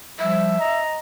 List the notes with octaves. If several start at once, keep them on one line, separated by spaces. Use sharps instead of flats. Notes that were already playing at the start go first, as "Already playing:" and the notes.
F3 G3 E5
D#5 A#5